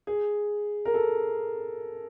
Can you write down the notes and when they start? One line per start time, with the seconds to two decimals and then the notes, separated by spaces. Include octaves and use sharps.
0.07 G#4
0.85 A#4
0.94 A4